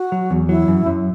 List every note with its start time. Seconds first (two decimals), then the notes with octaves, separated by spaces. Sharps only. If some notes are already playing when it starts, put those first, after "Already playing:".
Already playing: F#4
0.12 F#3
0.31 E2
0.49 F#3 E4
0.68 F#2
0.86 F#2